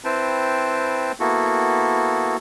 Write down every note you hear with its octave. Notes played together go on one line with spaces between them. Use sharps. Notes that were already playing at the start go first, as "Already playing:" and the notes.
C4 E4 B4 C5 G5 A5
A#3 B3 E4 F#4 A4